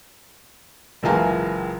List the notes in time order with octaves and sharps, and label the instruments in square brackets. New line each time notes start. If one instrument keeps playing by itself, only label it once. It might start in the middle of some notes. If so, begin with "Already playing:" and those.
[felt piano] F#1 C#2 E3 F4 G#5 A#5